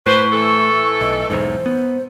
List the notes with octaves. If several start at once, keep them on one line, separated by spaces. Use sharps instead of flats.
A2 B4 C5 C#6
E3 A3 A4
B1 D#5
B1 E2 G#2 C5
B3